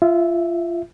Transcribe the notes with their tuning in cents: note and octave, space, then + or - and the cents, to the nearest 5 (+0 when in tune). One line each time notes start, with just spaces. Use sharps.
F4 -20 E5 +0